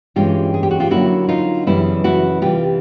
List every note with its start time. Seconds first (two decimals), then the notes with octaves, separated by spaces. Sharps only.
0.16 G2 E3 G#3 C#4 F4 G4
0.54 G#4
0.63 G4
0.71 F#4
0.80 F4 G4
0.91 D3 F#3 A#3 C#4 E4 F#4
1.29 D#4 F4
1.67 F#2 C#3 E3 G3 B3 E4
2.04 E4 F#4
2.42 C3 E3 G3 F4 G4